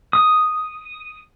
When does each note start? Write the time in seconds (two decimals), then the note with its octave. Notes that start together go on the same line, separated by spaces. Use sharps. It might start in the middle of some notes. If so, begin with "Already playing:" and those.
0.13 D#6